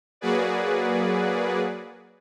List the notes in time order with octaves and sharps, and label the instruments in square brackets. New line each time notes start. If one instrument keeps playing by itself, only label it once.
[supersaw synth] F#3 A#3 F#4 G#4 B4 D5